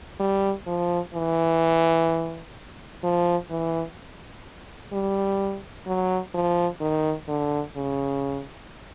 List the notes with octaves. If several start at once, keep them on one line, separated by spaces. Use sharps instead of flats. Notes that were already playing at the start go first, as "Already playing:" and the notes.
G3
F3
E3
F3
E3
G3
F#3
F3
D#3
D3
C#3